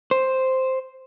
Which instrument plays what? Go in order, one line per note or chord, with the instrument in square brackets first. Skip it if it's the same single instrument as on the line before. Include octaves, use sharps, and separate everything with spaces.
[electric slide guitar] C5